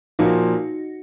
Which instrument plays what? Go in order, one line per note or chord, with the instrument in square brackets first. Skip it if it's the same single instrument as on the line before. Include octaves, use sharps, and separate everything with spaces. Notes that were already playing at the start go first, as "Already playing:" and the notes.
[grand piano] A#2 F3 A#3 [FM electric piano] D#4 F#4